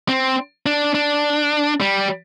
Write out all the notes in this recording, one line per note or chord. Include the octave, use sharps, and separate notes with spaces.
C4
D4
D4
G3